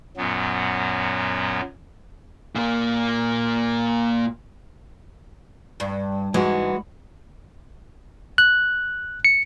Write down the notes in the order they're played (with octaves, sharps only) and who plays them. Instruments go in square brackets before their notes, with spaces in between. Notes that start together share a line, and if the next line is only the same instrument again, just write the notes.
[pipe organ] F#2 A#2 F#3 B3
[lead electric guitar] A#2 A#3
[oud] G2
[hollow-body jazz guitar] G#2 [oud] E3 [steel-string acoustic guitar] G#3 F#4
[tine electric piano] F#6
C#7